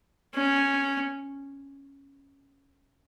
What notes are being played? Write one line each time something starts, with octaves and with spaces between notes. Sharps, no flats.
C#4